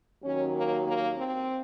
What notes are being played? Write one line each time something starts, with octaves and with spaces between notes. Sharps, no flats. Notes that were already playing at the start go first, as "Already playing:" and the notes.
D#2 D#3 F#3 C#4
A#3
A#3
C4